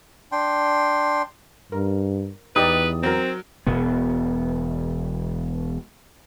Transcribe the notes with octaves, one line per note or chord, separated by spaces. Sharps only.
D4 G5 C6
G2 A#4
E2 D#4 G4 B4 D5 D#6
F#3 C4 A#4
E1 B2 B3